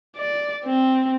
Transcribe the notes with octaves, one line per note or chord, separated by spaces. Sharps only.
D5
C4